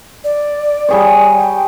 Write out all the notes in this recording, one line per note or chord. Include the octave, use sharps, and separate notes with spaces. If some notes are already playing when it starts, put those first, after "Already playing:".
D5
G3 G#4 C#5
G5